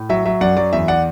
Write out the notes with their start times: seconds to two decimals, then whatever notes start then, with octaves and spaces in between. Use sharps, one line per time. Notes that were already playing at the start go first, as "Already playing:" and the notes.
Already playing: A2
0.09 F#3 E5
0.25 F#3 E5
0.41 F#2 D5 F#5
0.57 F#3 D5
0.73 E2 E5
0.88 D5 F#5